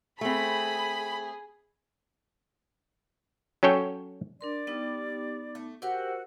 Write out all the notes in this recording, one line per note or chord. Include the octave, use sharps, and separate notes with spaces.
A3 C4 G#4 B5
F#3 C#4 A4 C#5 G5
D4 A#4 D5 C6
G3 B3 D#4 D6
A3
F#4 G4 A#4 C5 F#5 E6